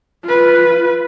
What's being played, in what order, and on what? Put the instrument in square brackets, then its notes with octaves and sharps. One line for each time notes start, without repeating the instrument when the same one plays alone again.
[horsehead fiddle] F4 B4